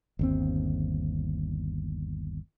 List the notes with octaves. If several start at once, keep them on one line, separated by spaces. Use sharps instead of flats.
G1 D#2 C4